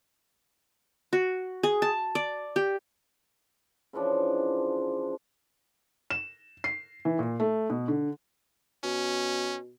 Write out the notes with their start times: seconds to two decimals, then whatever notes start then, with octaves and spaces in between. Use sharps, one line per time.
1.13 F#4
1.63 G#4
1.82 A5
2.15 D5
2.56 G4
3.93 C#3 E3 F3 D4
6.10 E7
6.64 C7
7.05 E3
7.19 A#2
7.40 A3
7.70 B2
7.88 D3
8.84 B2 C#4